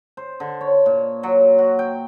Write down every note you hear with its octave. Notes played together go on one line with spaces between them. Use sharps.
C5
D3
C#5
A#2
F#3
F#4
G5